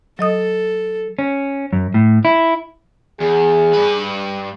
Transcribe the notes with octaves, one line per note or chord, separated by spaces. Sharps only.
F#3 A4 D#5 D#6
C#4
F#2
A2
E4
E2 G#4
G2 B4